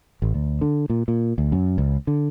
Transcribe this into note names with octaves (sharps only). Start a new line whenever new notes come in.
A1
D2
D3
A#2
A#2
D2
F#2
C#2
D3